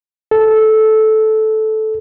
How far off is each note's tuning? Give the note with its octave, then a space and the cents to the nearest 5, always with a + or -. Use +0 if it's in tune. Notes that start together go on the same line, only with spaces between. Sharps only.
A4 -10